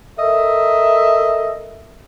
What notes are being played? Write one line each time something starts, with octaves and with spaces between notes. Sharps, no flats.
A4 A#4 D#5 E5